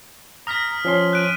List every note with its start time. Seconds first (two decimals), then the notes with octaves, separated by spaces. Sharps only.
0.47 A#5 D#6 F6 A#6 B6
0.85 F3 C#4 C6
1.13 F#6 D7 D#7